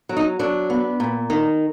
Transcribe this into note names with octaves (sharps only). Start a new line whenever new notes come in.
F#3
D#4
F#3 D4
B3
A#2
D#3